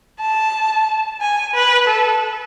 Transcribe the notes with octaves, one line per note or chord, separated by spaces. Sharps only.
A5
G#5
B4
A4